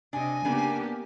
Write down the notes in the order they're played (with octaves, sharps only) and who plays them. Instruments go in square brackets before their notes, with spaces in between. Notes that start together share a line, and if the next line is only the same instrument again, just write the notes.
[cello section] C3 D#5 [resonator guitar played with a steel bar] D4 [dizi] G#5
[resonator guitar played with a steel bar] C#3 D4 [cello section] A#3 B3 G4